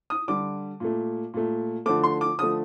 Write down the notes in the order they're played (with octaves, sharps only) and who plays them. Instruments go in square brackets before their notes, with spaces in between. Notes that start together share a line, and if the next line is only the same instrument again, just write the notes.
[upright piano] D#6
D3 G3 D6
A#2 A3
A#2 A3
D3 F3 A3 D6
C6
D6
D3 F3 A3 D#6